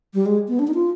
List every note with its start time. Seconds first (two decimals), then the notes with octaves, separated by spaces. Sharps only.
0.14 G3
0.26 G#3
0.48 B3
0.59 D4
0.67 D#4
0.74 F4